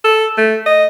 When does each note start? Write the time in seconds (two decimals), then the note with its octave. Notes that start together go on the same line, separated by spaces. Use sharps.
0.05 A4
0.38 A3
0.66 D#5